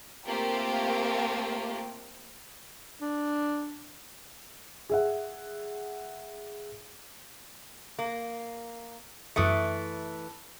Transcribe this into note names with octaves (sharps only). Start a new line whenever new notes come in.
A3 A#3 C4 F4 G4 A#4
D4
G#4 E5 F#5
A#3
F#2 E3 A3 D#6 C#7